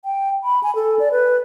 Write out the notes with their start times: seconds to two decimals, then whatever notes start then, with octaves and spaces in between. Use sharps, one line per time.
0.05 G5
0.44 B5
0.63 G#5
0.75 A4
0.99 D5
1.12 B4